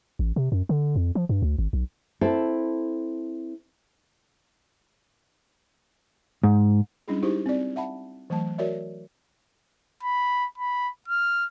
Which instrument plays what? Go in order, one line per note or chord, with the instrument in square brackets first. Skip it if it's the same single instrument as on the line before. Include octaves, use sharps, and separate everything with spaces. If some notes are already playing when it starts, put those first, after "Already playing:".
[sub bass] A1
C3
F#2
D3
F2
F3
G2
D2
G#1
B1
[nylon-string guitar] C4 E4 A4
[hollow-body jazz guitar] G#2
[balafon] G3 G#3 C#4 D4 E4 G#4
D#4 E4 G4 G#4 C5
C4 D5
E5 F#5 A5 B5
E3 F#3 A3 A5
F#4 A#4 C#5 D5 E5
[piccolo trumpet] B5
B5
F6